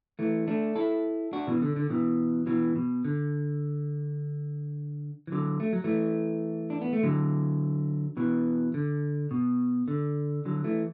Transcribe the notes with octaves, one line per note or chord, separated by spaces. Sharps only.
E3 A3
A3 D4
E4 A4
D4 F#4
B2 E3
D3
D3
B2 E3
B2 E3
B2
D3
E3
D3 F#3
A3
F#3
E3 A3
D4
B3
A3
D3 F#3
B2 E3
D3
B2
D3
D3 F#3
E3 A3